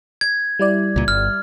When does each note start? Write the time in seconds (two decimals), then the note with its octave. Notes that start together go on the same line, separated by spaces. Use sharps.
0.21 G#6
0.59 G3 E4 D5
0.96 C#2 A#2
1.08 G1 F6